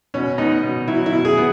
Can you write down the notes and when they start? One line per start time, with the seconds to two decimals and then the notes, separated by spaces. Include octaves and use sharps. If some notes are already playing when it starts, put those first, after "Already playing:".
0.14 B2 C#4
0.38 B3 D#4
0.63 B2
0.88 F#3 E4
1.06 E4
1.12 B2
1.25 G#4
1.37 B3